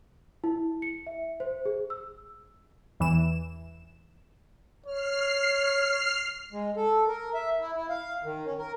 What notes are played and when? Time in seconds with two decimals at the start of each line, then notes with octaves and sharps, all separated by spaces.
0.44 E4
0.82 C#7
1.07 E5
1.40 C5
1.65 G#4
1.90 E6
3.00 E2 E3 E7
4.86 C#5 F6 C7
6.53 G#3
6.76 A4
7.08 A#4
7.34 E5
7.60 E4
7.77 E4
7.90 F5
8.24 D#3
8.45 C#4
8.58 A#4